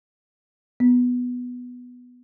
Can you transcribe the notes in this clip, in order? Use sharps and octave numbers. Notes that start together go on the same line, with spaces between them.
B3